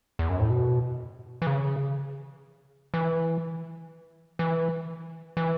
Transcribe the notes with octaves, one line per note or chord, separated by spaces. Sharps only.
E2
F#2
A2
B2
E3
C#3
E3
E3
E3